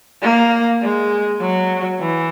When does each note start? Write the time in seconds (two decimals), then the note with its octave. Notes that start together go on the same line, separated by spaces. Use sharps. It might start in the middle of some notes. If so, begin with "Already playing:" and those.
0.22 A#3
0.82 G#3
1.41 F#3
2.00 E3